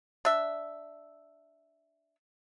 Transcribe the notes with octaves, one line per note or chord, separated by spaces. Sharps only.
D4 E5